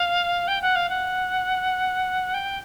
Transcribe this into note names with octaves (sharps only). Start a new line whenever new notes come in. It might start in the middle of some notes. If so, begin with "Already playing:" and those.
Already playing: F5
G5
F#5
F5
F#5
G5